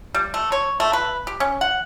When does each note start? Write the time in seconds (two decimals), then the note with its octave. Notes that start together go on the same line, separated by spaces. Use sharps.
0.14 G3
0.34 A3
0.52 C#5
0.80 A3
0.93 B4
1.27 G4
1.40 C#4
1.61 F#5